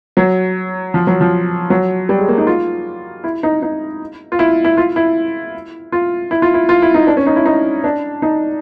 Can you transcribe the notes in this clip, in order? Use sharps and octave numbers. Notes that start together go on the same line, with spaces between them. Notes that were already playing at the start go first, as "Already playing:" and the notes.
F#3
F3
F#3
F3
F#3
G3
G#3
A#3
D#4
F4
E4
D#4
D#4
F4
E4
E4
F4
E4
F4
E4
F4
E4
F4
E4
D#4
D4
C#4
D#4
E4
D#4
D4
D#4